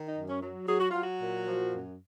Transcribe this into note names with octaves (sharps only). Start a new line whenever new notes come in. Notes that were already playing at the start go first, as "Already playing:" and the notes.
Already playing: D#3
D#4
F#2
C#4
F#3
F#3 G#4
F#4
F#3 F4
F#4
A#2
F3
F#2